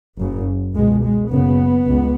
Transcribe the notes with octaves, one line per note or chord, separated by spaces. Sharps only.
F#1 F#2 C#3
C#2 B2 G#3
G#3
F#1 F#2 C#3 B3
C#2